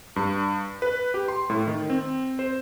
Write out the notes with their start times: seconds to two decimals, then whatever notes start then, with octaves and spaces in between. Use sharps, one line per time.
0.16 G2
0.82 B4
1.14 G4
1.28 C6
1.50 A2
1.67 D#3
1.90 C4
2.39 C5